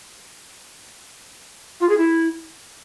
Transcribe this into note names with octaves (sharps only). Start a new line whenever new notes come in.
F4
G#4
E4